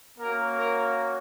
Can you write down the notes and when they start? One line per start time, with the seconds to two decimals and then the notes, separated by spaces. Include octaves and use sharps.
0.19 A#3 C#4 F#4 A#4
0.57 A#4